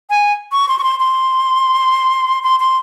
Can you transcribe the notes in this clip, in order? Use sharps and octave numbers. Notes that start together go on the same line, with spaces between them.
G#5
C#6
C6
C#6
C6
C6
C6
C6